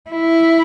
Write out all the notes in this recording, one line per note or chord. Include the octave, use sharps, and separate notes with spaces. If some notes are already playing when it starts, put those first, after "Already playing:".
E4